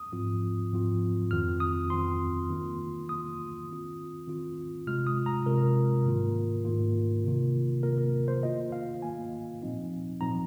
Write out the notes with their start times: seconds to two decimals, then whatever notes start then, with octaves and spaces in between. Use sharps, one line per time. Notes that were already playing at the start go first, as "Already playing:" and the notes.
Already playing: D#6
0.12 G#2 F3 C4 F4
0.72 G#2 F3 C4 F4
1.31 F2 D#3 C4 F4 F6
1.60 D#6
1.90 F2 D#3 C4 F4 C6
2.50 D#3 A#3 F4
3.09 D#3 A#3 F4 D#6
3.68 D#3 C4 F4
4.27 D#3 C4 F4
4.87 C3 G#3 F4 F6
5.07 D#6
5.26 A#5
5.46 C3 G#3 F4 A#4
6.05 G#2 D#3 A#3 F4
6.65 G#2 D#3 A#3 F4
7.24 C3 D#3 A#3 F4
7.83 C3 D#3 A#3 F4 A#4
7.98 A#4
8.28 C5
8.43 D#3 A#3 F4 D#5
8.72 F5
9.02 D#3 A#3 F4 G#5
9.62 A#2 F3 C4 D#4
10.21 A#2 F3 C4 D#4 A#5